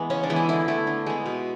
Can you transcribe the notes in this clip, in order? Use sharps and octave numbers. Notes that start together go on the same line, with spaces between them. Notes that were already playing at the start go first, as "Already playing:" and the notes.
Already playing: E3 G#3 B3 E4
C#3 C#4
D4
E3 G#3 B3
E4
D3 E4
A3 E4
D3
G#3 B3
B2